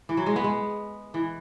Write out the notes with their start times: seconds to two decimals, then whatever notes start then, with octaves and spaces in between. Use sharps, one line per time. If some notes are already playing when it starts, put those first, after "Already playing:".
0.09 E3
0.17 F#3
0.26 G#3
0.36 B3
0.44 G#3
1.14 E3